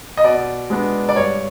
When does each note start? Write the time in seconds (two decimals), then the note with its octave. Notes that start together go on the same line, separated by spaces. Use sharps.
0.17 D#5
0.24 B2 D5
0.70 G#3 B3 D4
1.09 D5
1.16 G2 C#5